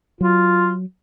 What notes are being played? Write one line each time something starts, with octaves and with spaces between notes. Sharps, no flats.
F#3 F4